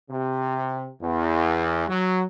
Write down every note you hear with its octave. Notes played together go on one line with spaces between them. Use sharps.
C3
E2
F#3